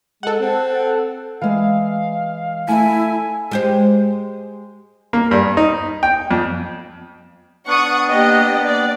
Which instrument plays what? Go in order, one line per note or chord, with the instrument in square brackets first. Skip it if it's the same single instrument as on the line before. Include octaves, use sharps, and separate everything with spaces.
[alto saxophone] G#3 [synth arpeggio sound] A4 F#5
[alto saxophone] C4
[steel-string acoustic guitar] E3 G#3 G#5 [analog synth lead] F5
[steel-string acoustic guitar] A3 E5 [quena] E4 [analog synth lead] G#5
[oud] G#3 G4 C5
[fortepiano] A#3
G2
D#4
G5
F2
[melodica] B3 D4 [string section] F#5 C#6 D#6
[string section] A#3 G4 D#5
D5